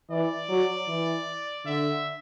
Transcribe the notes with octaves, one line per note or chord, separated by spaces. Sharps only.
E3 D5
F#3
E3
D3 E5